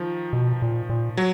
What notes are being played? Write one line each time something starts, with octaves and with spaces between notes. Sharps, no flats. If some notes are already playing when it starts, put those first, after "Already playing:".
Already playing: D#3 F3
B2
A#2
A#2
F#3